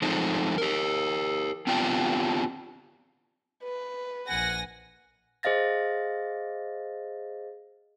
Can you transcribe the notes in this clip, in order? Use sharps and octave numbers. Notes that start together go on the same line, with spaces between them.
F3 G#3 A3 C4 D#4
G4 A#4
B3 C4 D4 F4 G4 G5
B4
A#1 F#5 G#5 A#6
G#4 C5 D#5 F5 A6 A#6